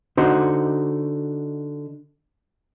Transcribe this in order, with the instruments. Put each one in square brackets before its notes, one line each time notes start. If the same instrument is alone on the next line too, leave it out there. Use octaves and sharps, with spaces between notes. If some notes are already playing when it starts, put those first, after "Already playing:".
[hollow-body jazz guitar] D3 D#4 F#4 C5